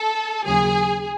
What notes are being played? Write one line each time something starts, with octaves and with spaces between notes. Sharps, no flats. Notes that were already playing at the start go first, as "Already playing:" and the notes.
Already playing: A4
D#2 C#3 F#3 G#4